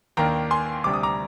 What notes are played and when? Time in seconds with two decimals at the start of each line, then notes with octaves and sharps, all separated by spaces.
0.17 D#2 D#3 A#3 D4 G5 A#5
0.51 G#5 C6
0.84 D2 C3 G3 D4 D6
0.94 D#6
1.03 A#5 D6